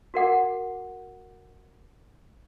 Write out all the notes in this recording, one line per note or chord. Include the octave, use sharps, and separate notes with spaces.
F#4 A#4 F#5 D6